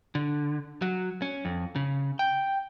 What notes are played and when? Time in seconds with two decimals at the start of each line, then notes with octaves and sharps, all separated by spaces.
0.15 D3
0.82 F#3
1.22 C#4
1.45 F2
1.76 C#3
2.19 G5